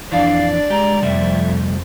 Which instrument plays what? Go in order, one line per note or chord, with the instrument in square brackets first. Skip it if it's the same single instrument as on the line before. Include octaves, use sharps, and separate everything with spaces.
[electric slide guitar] F2 E3 [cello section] D4 [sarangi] D5 [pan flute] F5
[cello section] G#3 [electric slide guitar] G4 [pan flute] A#5
[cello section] F2 [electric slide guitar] C3 G3 A3 [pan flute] E5